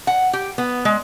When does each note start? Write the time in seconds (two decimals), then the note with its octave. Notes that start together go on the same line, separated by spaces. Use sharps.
0.07 F#5
0.33 G4
0.58 B3
0.85 G#3